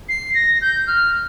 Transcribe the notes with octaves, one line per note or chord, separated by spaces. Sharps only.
C7
A#6
G6
F6